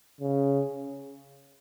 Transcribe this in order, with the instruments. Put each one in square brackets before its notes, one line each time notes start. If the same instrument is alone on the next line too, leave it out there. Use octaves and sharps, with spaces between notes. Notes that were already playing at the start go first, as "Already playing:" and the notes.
[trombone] C#3